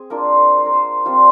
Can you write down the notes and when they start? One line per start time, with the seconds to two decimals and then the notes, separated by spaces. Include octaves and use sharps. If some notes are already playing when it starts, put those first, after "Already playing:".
Already playing: C4 G#4
0.10 A#3 D4 F4 A#4
0.24 C5
0.36 A#4
0.58 C5
0.66 A#4
0.73 C5
1.05 G3 C4 F4 C5